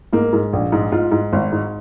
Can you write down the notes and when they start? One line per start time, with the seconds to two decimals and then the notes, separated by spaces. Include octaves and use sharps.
0.13 G#2 A#3
0.33 G#2
0.53 A#1
0.72 G#2
0.92 G#2 F4
1.12 G#2
1.33 G#1
1.52 G#2